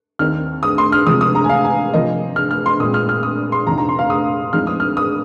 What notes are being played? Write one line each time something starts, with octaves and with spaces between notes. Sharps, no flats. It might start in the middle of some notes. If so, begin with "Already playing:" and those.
D#2 D#3 C4 D#4 F6
D#6
C6
F6
C3 F3 G#3 D#6
D#6
A#5
G#5
F5
G#5
C3 F3 A#3 D#5
F6
F6
C6
A#2 G#3 C4 D#6
F6
F6
D#6
C6
F2 C3 F3 C4 D#4 A#5
A#5
C6
F5
D#6
F2 F3 G#3 C4 D#4 F6
D#6
F6
D#6